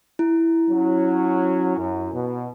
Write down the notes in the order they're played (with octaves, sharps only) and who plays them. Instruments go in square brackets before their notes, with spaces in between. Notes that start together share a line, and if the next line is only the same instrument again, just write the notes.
[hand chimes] E4
[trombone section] F#3 C#4
F#2
B2